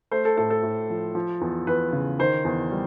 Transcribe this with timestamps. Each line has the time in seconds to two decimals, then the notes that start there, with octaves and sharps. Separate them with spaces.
0.11 A3 C5
0.25 A4
0.37 A2 A4
0.50 A4
0.63 A2
0.90 F3
1.15 F3
1.41 E2
1.67 E2 B4
1.93 C#3
2.19 D#3 C5
2.45 E2
2.71 G3